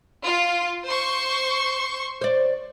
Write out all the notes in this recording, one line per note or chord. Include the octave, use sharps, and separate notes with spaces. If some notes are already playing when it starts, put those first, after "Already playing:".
F4
C5 C6 C#6
C5 D5